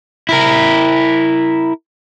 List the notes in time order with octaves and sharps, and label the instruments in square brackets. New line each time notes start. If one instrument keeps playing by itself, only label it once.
[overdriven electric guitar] E4 A#4